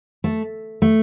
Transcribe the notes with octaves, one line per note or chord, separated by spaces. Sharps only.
A3
A3